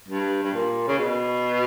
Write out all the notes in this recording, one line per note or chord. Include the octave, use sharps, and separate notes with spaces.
G2
G2
A#2
C#3
B2